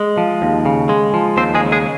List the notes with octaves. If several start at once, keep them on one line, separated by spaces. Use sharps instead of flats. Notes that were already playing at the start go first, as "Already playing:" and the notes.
Already playing: G#3
F3
D#2
C#3
G#3
F3
D#2 C4 C5
G#3 G#4
C#3
G#3 G#4